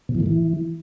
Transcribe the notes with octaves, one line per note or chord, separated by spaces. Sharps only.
B2
E3
A2
E3